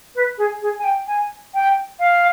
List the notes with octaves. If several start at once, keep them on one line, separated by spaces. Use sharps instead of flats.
B4
G#4
G#4
G#5
G5
G#5
G5
F5